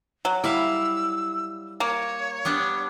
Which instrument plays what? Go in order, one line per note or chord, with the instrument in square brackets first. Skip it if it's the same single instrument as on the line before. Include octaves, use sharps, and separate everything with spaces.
[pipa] F#3
[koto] G3 E5 F5 [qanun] E4 [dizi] E6
[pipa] A#3 [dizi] C#5
[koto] G3 B3 D4